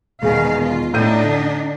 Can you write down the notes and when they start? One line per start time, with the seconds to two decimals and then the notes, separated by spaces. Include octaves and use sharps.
0.22 E1 B2 D#3 G#4 F5 G#5
0.62 F4
0.94 A2 D4 D#4 G6 D#7
1.23 D3